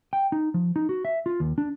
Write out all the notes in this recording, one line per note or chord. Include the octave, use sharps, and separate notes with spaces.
G5
D#4
F3
D#4
F#4
E5
F4
D#2
D4